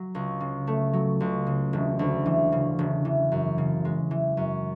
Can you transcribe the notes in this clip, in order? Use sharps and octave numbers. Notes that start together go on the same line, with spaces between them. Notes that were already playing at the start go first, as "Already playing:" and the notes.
Already playing: F#3
C#2
C#3
A3
F#3
C#2
C#3
E1
D2
E3
C#3
E1
E3
F#2
C#3
G#3
E3
F#2